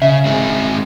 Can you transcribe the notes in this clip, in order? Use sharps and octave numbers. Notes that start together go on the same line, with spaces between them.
C#3 E5
G#3 C4 G#4